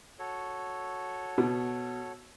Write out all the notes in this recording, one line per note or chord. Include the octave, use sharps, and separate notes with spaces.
F#4 A4 C#5
B2